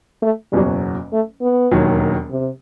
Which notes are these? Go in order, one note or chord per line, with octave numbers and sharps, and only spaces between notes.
A3
F#1 E2 B2 F#3 G3
A3
B3
E1 D#2 D#3 F#3
C3